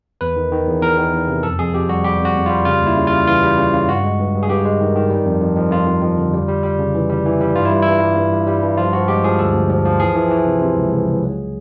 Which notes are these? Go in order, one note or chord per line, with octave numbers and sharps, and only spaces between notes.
E2 B4
D#3
D#3
E2
E2 A#4
D#3
E2
C3
F2 A4
F2 G#4
F2 G4
G3 F#4
G3 G4
F2
F#4
F2
G3 F4
C#3 F4
D#2
E4
C#3
F4
G3
E3 F4
G3
C#3
C#3
G2 F#4
G#3
G2
G2
G#4
G2 G4
G#3
D#3
D#3
G3
F2
F2
F2
F2 F4
F2
F2
D3
G3
G3
G3
C#3
E3
G3
E3
G3
G2 F4
E4
G2
G2 E4
G2
G2
G2
G3
G2
F3 F4
F3 F#4
G#3 G4
F3 G#4
D2 A4
D2
F3
F3
E3 G#4
E3
E3
C3
C3
C#2
C#2
C#2
F#3